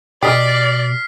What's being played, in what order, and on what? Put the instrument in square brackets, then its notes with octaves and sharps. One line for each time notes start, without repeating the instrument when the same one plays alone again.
[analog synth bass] B2 [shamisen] G4 D#5 [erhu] D5 [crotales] F6 B6 C7